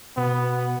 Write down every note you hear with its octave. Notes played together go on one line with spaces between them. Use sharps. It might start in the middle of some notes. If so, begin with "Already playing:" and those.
B2 B3